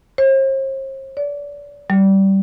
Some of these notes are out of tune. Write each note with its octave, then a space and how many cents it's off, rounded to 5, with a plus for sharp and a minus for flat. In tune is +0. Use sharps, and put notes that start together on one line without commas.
C5 +45
D5 -30
G3 -15